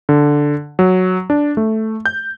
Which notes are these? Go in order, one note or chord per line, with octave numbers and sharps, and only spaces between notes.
D3
F#3
D4
A3
G6